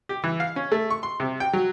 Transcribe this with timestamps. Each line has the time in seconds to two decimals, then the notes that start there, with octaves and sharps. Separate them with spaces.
0.09 G4
0.24 E3
0.40 F5
0.56 C#4
0.72 A3
0.90 C#6
1.03 C6
1.20 C3
1.40 G5
1.53 F#3